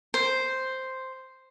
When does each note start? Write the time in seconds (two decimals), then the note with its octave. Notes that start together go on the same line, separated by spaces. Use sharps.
0.14 C5